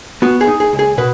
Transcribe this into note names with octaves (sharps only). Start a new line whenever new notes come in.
B3 F#4
G#4
D#4
G#4
C#2
G#4
B2 B4